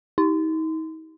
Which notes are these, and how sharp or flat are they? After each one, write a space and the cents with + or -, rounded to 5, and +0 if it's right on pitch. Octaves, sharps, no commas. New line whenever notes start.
D#4 +40